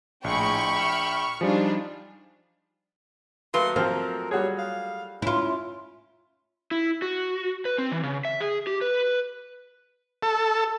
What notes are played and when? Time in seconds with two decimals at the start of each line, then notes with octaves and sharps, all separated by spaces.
0.24 A#1 A2 G#3 G5 B5 C#6
0.76 E5 F6
1.41 F3 G3 D4 D#4 F4 G#4
3.54 F#3 A3 A#3 B4 C6
3.76 F3 C4 F4 A#4
4.31 G3 F#4 G#4 C#5
4.58 F5
5.22 C#4 E4 F4
6.71 E4
7.02 F#4
7.65 B4
7.78 C4
7.92 E3
8.03 C#3
8.25 E5
8.41 G#4
8.67 G4
8.81 B4
10.22 A4